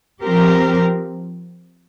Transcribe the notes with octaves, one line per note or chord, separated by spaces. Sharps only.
F3 C4 G4 A#4